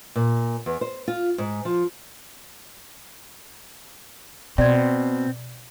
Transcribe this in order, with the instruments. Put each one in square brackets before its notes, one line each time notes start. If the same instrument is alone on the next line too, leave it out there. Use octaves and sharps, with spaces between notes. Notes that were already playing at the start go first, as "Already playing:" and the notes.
[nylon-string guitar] A#2
E2
C5
F4
G#2
F3
[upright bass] B2 [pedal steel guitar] C4 [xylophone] D5 C6 G#6